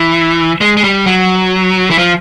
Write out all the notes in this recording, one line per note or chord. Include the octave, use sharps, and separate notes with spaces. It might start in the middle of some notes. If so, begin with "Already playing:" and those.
Already playing: E3
G#3
G#3
G3
F#3
E3
F3